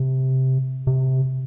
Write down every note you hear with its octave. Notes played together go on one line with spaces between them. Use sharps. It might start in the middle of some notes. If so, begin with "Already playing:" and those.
Already playing: C3
C3